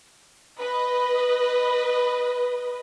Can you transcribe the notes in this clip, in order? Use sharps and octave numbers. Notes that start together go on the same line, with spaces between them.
B4 D#5